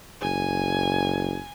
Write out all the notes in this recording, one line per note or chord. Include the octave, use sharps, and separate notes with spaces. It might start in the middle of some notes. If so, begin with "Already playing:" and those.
F#1 G#5